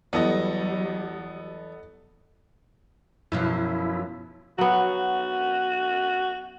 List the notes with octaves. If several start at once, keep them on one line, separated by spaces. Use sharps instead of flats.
E2 F#3 G3 B3 A4 D#5
F#2 B2 F3 E4
F#3 B3 F#4